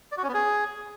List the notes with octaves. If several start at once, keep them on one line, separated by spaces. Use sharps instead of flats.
D5
F#4
C#4
B3
G#4